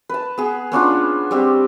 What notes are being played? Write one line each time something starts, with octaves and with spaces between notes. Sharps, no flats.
B4 A5
B3 G#4
B3 C#4 D4 F4
G3 C4 G4